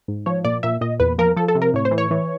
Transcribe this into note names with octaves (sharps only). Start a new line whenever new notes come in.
G#2
F3 C#5
A#2 D5
A#2 E5
A#2 D#5
E2 B4
F3 A#4
F3 A4
A4
C3
A#4
A2 C#5
C5
E3
C#5
E3